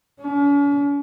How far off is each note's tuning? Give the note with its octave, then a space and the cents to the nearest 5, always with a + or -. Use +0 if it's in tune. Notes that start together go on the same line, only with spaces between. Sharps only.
C#4 +45